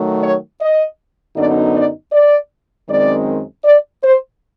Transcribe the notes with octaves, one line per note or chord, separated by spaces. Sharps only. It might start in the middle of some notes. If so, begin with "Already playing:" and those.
Already playing: D#3 F#3 A3
C#5
D#5
F#2 D3 F#3 B3 D#4 D5
D5
D5
F#2 D#3 G#3 C4 D5
D5
C5